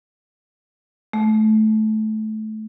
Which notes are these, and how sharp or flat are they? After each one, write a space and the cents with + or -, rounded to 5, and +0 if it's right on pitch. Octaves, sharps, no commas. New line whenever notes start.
A3 -20